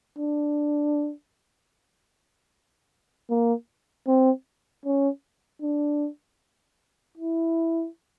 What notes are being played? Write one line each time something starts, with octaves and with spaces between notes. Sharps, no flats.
D4
A#3
C4
C#4
D4
E4